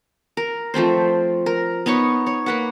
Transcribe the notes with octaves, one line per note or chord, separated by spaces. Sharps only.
A#4
F3 A3 C4 C5
A#4
B3 D#4 C#5 C#6
C#5
A#3 B4 F#5